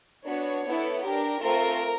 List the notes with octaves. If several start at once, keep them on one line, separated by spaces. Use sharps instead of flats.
B3 D4 F#4 C#5
B3 E4 A4
D4 G4 A#4
A3 C4 F4 A#4